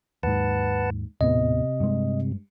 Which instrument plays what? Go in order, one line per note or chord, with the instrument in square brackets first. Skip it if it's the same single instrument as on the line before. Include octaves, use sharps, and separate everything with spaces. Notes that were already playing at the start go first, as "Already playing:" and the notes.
[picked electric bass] D#2 G#2 [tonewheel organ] B4 F#5 A5
[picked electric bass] D#1 A2 B3 [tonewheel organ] C3 [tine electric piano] D#5
[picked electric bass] G2 G#3